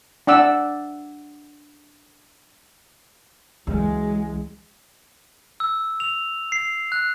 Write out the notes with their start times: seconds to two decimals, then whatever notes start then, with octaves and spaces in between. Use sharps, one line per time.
0.27 D4 D5 F#5 E6
3.67 C#2 E3 F#3 G#3
5.60 E6
6.00 F7
6.52 C7
6.92 F#6